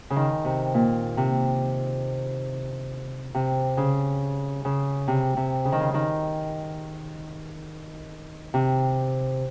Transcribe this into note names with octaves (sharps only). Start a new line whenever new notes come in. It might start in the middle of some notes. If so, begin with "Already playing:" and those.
C#3
D#3
C3
A#2
C3
C3
C#3
C#3
C3
C3
C#3
D#3
C#3
D#3
C3